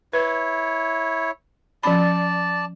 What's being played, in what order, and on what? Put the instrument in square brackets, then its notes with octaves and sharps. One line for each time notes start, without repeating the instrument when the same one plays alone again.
[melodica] E4 C#5 [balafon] B4
[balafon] F3 C#4 B5 [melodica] D5 A5